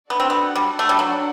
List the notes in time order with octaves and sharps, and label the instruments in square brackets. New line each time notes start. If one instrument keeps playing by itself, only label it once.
[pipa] B3 [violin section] D4 F#4 A4 D5 F#5
[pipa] C4
B3
G3
A3
G3
F#3